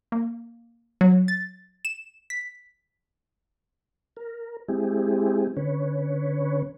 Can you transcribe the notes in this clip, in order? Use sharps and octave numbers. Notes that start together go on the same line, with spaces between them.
A#3
F#3
A6
E7
B6
A#4
G#3 C4 E4 G4 G#4
D3 C#4 B4 C#5